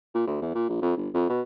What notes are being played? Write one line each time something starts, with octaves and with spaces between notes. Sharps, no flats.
A#2
D2
E2
A#2
A#1
F2
G1
F2
B2